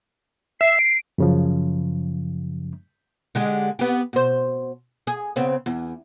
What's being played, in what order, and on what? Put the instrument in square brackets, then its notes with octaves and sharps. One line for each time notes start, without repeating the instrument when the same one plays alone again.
[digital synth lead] E5 [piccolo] C7
[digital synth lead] D7
[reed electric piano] F#2 C#3 F3
[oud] D3 G#3 G4
B3 G4
B2 C5
G#4
C#3 B3 C4
E2